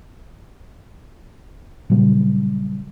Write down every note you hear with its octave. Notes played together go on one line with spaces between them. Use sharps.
A#2 C#3 F#3 G3